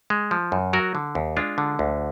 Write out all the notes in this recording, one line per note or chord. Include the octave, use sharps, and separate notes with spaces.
G#3
F3
F#2
F#3 F#4 A#4
D3
D#2
G#3 D4 F4
D3
D2